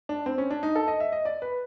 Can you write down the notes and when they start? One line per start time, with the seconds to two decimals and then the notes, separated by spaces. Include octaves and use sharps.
0.09 D4
0.26 C4
0.38 C#4
0.50 D4
0.63 D#4
0.76 A4
0.88 D#5
1.00 E5
1.12 D#5
1.25 D5
1.42 B4